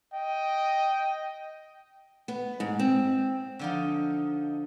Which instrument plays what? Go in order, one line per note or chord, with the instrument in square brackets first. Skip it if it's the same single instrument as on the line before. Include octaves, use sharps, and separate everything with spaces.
[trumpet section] D#5 G5
[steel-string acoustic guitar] B3
G#2
C4
[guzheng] D3 F3 D#4